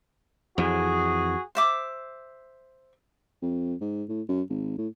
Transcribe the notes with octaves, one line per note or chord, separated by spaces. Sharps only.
F2 E3 F#4 G#4
C5 E5 D6
F2
G#2
A2
F#2
G#1
A2